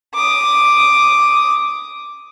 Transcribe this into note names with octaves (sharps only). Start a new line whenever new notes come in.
D6 D#6